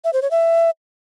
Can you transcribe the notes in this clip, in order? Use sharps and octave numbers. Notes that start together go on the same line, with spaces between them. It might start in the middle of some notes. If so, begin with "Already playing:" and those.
E5
C5
C#5
E5